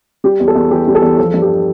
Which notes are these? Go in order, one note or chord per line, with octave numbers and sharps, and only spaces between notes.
G3 G4
E2
A4
E2
E3 G4
G3
A4
E2
F3 A4
G2
G4